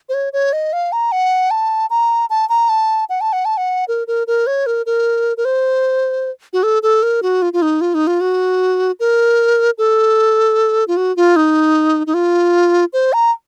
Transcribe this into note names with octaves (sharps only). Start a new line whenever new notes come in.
C5
C#5
C#5
D#5
F5
A#5
F#5
A5
A#5
A5
A#5
A5
F#5
A5
F#5
A5
F#5
A#4
A#4
A#4
C#5
A#4
A#4
A#4
C5
F#4
A4
A4
A#4
F#4
F4
F4
D#4
F4
D#4
F4
F#4
A#4
A4
F4
F#4
F4
D#4
D#4
F4
C5
A#5